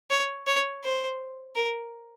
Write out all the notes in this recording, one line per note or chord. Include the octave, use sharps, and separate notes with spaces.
C#5
C#5
C5
A#4